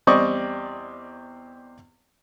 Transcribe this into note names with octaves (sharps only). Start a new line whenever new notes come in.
E2 G3 C4 D5 D#5 C#6